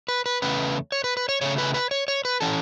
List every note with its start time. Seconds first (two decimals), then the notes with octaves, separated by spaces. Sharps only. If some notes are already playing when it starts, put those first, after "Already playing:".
0.08 B4
0.26 B4
0.42 E2 C#3 A3 C#4 B4
0.92 C#5
1.04 B4
1.17 B4
1.29 C#5
1.41 C#3 A3 C#4 C#5
1.58 B4
1.74 B4
1.91 C#5
2.08 C#5
2.25 B4
2.41 E3 C#4 A4